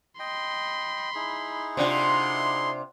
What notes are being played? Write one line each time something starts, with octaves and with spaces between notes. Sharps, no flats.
D#5 G5 B5 C6
D#4 E4 G#4
C3 D4 F4 F#5 C6